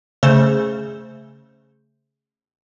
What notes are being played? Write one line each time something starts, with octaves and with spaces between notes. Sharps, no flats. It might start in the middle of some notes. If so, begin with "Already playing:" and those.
C#3 A3 C5